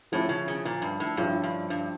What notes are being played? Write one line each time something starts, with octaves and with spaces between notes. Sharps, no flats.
A2 F3 C#4 E4
C#3
C#3
A#2
G2
A2
G2 F3 C#4 E4
G2
G2